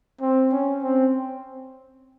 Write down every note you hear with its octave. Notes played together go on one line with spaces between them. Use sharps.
C4
C#4
C4